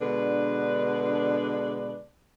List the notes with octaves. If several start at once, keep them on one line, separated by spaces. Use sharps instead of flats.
B2 D3 G#3 D4 B4